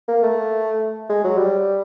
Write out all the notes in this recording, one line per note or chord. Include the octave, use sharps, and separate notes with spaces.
A#3
A3
G#3
F#3
G3